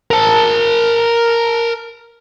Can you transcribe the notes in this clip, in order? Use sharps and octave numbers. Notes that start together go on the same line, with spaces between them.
A#4 A5